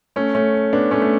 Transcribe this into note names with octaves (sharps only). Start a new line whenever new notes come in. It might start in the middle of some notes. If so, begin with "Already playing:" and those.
A3 C#4
A3 C#4
B3 D4
A3 C#4
A3